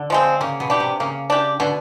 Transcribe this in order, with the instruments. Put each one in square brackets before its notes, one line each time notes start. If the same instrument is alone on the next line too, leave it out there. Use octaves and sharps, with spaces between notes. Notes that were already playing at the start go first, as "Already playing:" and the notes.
Already playing: [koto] D3
[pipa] F3 G#3 C4
[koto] C#3 [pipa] A#3
[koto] B2
[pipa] D4 G4
[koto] C3
[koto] C#3 [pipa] A#3
[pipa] D4 G4
[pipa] B2 [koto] D3